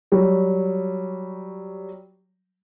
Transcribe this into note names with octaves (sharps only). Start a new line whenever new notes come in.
F#3 G3